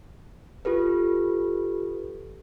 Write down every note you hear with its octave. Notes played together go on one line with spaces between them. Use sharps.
F4 G4 A4 B4